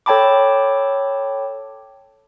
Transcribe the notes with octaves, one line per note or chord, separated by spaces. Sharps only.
A4 C#5 G5 A5 B5 D6